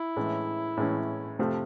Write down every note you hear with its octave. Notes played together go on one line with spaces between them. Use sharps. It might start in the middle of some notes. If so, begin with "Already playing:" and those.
Already playing: E4
A2 E3 G#3 C#4
A2 E3 G#3 C#4
F2 C3 F3 A3